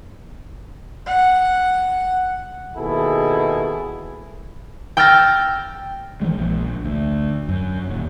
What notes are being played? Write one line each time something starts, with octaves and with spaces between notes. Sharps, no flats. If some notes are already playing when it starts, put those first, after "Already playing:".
F#5
D#2 B2 E4 G#4 A4
G5 E6 F6 G6 A6 A#6
E3 F3 G#3
A#1
D2
F#2
D#1